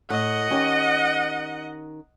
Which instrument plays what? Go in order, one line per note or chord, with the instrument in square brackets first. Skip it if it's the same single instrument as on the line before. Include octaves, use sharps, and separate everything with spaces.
[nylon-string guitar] A2 [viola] D#5 F#5
[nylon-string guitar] D#3 C#4 G4